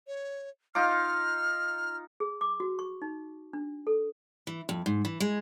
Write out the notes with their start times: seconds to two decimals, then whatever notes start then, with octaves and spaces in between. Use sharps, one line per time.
0.07 C#5
0.75 D#4 F4 D6 F6
2.20 G#4
2.41 D6
2.60 F#4
2.79 C#6
3.02 D#4
3.53 D4
3.87 A4
4.47 E3
4.69 F2
4.86 G#2
5.05 E3
5.20 G#3